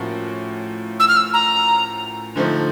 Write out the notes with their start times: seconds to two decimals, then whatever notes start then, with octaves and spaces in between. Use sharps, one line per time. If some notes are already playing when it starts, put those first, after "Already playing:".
Already playing: A2 F3 A#3 C#4 F#4
1.00 E6
1.08 F6
1.17 E6
1.34 A#5
2.35 D3 F3 A3 C4 D#4